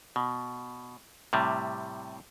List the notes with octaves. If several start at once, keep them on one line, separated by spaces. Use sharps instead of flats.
B2
A2 C3 G3